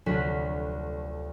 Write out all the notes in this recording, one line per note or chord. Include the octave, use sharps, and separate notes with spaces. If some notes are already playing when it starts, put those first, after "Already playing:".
F1 D2 F#3 F#4 B6